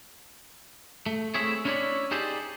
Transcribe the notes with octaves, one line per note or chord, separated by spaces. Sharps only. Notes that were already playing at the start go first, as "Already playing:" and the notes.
A3
A3 C4 E4 G#4 C#5
C#4 D4 E4 A4 C#5 D5
D#4 G4 G#4 C5 D5 A5